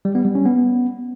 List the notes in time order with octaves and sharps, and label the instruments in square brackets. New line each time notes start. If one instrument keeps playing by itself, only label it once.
[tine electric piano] G3
B3
G3
C#4
B3